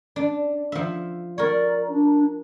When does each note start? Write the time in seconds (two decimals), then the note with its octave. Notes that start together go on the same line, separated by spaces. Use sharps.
0.16 D4
0.72 F3 E5
1.38 A#4 C#5 D5
1.89 D4